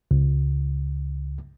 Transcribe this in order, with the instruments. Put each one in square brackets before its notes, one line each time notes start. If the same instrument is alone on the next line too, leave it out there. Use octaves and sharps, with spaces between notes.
[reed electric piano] C#2